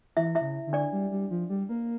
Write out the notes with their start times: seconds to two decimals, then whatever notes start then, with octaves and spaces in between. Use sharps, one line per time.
0.16 E3 E4 E5
0.35 E4 E5
0.41 C#3
0.67 D3
0.73 D4 D5
0.92 G3
1.11 G3
1.31 F3
1.50 G3
1.69 A#3